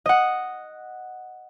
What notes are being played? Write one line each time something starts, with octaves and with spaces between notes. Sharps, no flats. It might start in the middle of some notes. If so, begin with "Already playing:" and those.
D#5 F#5